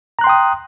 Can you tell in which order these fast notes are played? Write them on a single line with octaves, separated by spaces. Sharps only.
A#5 F#6 C6 G5 D#6